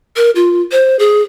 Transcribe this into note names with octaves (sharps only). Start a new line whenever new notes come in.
A#4
F4
C5
G#4